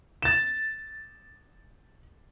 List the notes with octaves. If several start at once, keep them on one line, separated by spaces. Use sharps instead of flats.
A6 E7